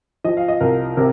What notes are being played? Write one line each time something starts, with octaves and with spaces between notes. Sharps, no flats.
F3 D#5
F5
D#5
C2 A#4
C3 A#4